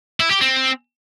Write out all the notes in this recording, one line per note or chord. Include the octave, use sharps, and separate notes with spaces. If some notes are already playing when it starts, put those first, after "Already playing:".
E4
G4
C4